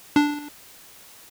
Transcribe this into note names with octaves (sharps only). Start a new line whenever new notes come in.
D4